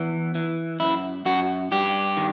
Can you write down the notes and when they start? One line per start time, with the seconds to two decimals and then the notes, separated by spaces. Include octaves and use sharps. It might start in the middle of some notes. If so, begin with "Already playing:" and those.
Already playing: E2 E3
0.35 E3
0.80 F#2 E4
1.25 F#2 F#4
1.71 G2 G4
2.17 D#3